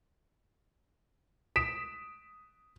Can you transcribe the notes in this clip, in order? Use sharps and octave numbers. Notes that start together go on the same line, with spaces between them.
D#6 B6 D7 E7